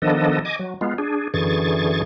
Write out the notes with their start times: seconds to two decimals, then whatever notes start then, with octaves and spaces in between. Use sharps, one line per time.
0.02 D#3 F3 B3 D4 A4 D#5
0.45 D#5 G#5 D6
0.59 F#3
0.81 G#3 B3 F4
0.98 D4 G#4
1.34 F#2 D3 E3 G#4 C#6 A6